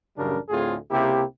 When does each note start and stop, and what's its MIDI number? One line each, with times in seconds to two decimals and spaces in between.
0.17 0.37 33
0.17 0.37 42
0.17 0.37 49
0.17 0.37 55
0.17 0.37 62
0.17 0.37 70
0.49 0.75 38
0.49 0.75 45
0.49 0.75 60
0.49 0.75 65
0.49 0.75 68
0.90 1.22 37
0.90 1.22 48
0.90 1.22 58
0.90 1.22 64
0.90 1.22 67